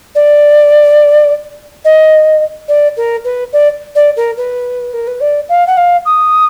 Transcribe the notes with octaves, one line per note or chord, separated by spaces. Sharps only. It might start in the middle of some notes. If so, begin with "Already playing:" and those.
D5
D#5
D5
A#4
B4
D5
D5
A#4
B4
A#4
B4
D5
F5
F#5
F5
D#6